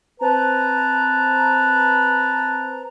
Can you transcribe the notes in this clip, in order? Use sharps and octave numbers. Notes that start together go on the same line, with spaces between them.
C4 B4 A5 A#5